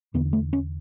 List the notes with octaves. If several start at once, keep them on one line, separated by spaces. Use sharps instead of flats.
E2 D3 B3
A3
C#4